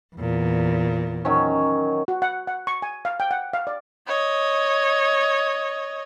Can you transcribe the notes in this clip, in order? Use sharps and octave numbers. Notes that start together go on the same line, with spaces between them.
E2 A#2
D#3 F#3 C#4
F#4
F#5
F#5
C#6
G#5
F5
G5
F#5
F5
D5
C#5 D#5